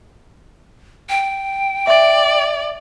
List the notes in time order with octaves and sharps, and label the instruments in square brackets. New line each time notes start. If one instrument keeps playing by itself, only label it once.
[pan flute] G5
[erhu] D5 [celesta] E5